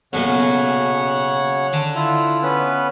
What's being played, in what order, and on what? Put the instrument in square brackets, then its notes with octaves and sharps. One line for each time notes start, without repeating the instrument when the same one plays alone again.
[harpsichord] B1 F#2 A#2 [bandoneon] C#3 C#5 F#5
[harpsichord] D3
[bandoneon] E4 F4
B3 C#4 B4